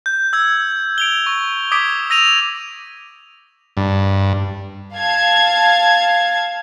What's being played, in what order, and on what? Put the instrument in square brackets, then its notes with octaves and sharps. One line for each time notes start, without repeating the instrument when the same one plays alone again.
[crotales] G6
E6 G#6
D7 F7 G7
C#6
D6 D#6 G#6 B6 D7
E6 A#6 D#7 F7
[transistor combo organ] G2
[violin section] F5 A5 G#6